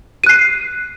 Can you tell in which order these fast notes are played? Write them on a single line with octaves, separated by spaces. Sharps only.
D#7 F#6 C7